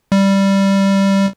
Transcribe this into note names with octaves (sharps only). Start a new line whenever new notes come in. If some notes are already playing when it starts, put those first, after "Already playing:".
G3